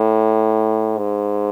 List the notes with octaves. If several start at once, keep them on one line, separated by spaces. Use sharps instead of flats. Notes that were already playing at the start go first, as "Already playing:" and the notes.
Already playing: A2
G#2